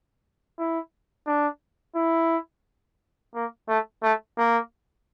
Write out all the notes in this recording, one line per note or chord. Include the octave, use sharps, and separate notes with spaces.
E4
D4
E4
A#3
A3
A3
A#3